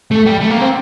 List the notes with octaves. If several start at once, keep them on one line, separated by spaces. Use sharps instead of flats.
A3
G3
A3
A#3
C4